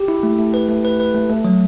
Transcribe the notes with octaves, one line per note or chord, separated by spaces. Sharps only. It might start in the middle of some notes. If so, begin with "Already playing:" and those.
Already playing: G4
E4
A3
A3
B4
A3
B4
B4
A3
A3
F#3